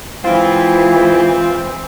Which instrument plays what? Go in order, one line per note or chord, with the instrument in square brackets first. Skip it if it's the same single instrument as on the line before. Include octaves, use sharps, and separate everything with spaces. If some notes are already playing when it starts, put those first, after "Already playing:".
[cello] E3 G#3 [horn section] C4 [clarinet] E4 [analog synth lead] F4